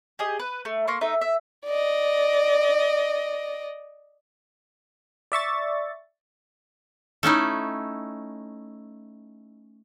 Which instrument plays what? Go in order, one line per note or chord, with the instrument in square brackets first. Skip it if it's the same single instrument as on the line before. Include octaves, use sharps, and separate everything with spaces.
[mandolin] G4 G#4 D#5
B4
A3
A#3 C6 C#6
A3 D#4 E5
E5
[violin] D5 D#5
[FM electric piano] D5 E5 C#6 A6
[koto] A3 C#4 D#4 E4